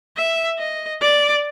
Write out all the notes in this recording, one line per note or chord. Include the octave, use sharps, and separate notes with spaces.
E5
D#5
D5